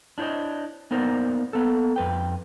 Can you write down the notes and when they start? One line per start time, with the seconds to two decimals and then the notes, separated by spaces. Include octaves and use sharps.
0.18 D4 E4 C5 C#5 D#5
0.91 A#3 B3 D#4 A#4 C5 D5
1.53 A#3 B3 A4
1.96 F2 B4 G5